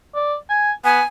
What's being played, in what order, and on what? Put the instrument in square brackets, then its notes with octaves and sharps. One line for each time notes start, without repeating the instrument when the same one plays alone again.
[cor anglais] D5
G#5
[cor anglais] B3 [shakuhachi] G#5